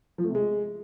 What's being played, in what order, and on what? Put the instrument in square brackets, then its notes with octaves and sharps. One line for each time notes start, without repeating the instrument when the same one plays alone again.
[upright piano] F3
A3
C3
G#3